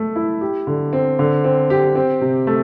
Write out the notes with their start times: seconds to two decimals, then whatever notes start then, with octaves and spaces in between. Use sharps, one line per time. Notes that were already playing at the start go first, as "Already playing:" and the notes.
Already playing: A3 A4
0.16 E4
0.41 G4
0.67 D3
0.93 C4
1.19 D3
1.44 C4
1.70 G4
1.96 C4
2.21 C3
2.47 A3